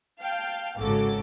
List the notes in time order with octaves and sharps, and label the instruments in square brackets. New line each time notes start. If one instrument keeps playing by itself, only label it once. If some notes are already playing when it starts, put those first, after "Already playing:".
[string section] F5 G5 A5
G#1 C#3 F#3 A4 D6